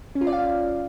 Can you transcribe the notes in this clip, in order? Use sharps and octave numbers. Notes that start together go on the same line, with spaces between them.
C#4
F4
D5
F5